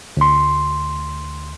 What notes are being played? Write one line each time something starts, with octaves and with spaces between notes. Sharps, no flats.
D2 C6